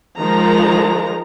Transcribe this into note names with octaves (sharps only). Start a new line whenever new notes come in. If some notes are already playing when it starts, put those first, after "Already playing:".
D#3 F3 G#3 A#5